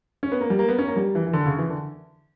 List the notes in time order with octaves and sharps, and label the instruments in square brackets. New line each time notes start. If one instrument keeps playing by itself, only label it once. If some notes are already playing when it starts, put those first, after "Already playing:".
[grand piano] C#4
B3
A#3
G3
A#3
B3
C#4
A#3
G3
E3
E3
D3
C#3
E3
D3